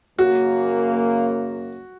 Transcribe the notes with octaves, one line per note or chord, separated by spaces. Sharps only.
F#2 C#3 A#3 F#4